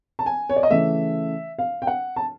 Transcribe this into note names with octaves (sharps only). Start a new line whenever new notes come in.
A5
G#5
C#5
D5
D#5
C#3 E3 A3 E5
F5
G5
F#5
A5